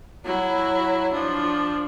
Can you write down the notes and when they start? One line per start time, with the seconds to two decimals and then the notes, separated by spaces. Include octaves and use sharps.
0.25 F#3 E4
1.13 F3 D4